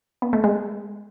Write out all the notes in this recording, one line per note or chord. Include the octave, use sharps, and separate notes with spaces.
B3
A3
G#3